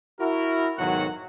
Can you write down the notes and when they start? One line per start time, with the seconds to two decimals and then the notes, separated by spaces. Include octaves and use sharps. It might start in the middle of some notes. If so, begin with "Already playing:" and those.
0.21 E4 F#4 A#4
0.78 B1 G#2 D#3 F#3 F#4 F#5